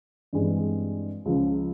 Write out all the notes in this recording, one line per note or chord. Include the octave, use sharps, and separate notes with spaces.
G2 E3 G#3 C4
C#2 C#3 F3